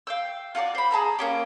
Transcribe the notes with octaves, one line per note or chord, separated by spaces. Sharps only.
F5 G5 E6
F4 F#4 A4 D5
C5 B5
G#4 A5 A#5 E6
A#3 C#4 G4